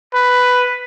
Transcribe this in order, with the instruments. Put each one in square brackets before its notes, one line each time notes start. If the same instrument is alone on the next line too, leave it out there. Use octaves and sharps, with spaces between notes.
[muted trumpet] B4